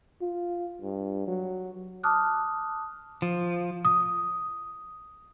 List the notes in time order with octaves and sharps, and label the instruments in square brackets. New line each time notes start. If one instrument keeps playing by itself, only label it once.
[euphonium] F4
G2
F#3
[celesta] A5 D6 D#6 F6 F#6
[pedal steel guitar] F3
[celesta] D#6